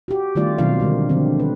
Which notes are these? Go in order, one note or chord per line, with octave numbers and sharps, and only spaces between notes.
F#4 G4
D#3 G3 A3 B3 F4 D5
B2 D#3 F#3 C4 F4 F5
D3 G3 G#3 D#4
D3 F3 C4
B4